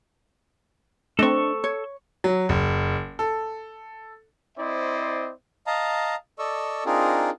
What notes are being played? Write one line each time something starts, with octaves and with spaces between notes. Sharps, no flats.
A3 C4 D4 A4 D#5 C#6
C#5
F#3
F#1
A4
C4 E4 C5 D5 D#5
D#5 F5 A5 A#5
A4 D5 D#5 C#6 E6
C4 D4 D#4 F4 G#4 A#4